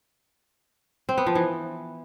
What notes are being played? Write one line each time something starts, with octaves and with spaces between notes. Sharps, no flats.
C4
B3
F3
E3